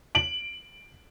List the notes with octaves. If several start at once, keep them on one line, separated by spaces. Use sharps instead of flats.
D7 F#7